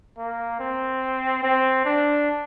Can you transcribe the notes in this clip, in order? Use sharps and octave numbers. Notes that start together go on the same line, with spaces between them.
A#3
C4
C4
D4